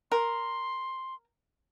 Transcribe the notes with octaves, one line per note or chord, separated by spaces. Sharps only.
A#4 C6